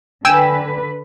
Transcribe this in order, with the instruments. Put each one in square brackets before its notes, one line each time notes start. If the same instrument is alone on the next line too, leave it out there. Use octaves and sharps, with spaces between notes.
[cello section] D3 B4 [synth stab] G5 G#5 E6